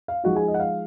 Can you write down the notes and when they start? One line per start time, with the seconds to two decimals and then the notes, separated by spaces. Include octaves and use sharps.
0.08 F5
0.23 F3 G#3 D#4 F#4 F#5
0.35 G#4 G#5
0.48 D#5
0.54 F#5
0.60 F5